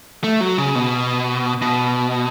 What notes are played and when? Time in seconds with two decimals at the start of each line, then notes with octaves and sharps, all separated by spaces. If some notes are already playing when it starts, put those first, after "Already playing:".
0.24 A3
0.40 F#3
0.58 C#3
0.75 B2
1.62 B2